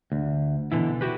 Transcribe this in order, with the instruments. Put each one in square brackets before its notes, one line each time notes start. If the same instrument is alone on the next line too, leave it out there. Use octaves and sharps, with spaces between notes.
[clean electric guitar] D2
B2 D3 E3 E4
E4 F#4 G4 B4